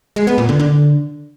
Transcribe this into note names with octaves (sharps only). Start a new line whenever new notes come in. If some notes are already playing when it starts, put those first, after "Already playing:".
G#3
B3
A#2
D3
D3